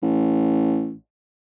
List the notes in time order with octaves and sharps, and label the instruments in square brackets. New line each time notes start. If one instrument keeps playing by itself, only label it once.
[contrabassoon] A1